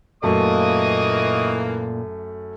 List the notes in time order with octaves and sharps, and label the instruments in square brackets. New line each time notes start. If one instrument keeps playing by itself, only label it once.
[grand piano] F#2 A3 [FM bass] A#2 [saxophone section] E3 A#3 [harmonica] D#5 C#6 D#6